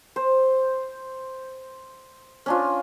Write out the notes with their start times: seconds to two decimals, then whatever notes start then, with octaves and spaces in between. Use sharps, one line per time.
0.16 C5
2.46 C#4 D4 F4